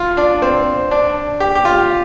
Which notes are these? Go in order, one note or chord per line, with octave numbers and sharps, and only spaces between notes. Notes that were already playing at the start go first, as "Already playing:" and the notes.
Already playing: F4
D4
C4
D4
G4
G4
F4